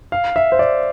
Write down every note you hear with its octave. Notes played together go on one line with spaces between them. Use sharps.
F5
E5
C5
D5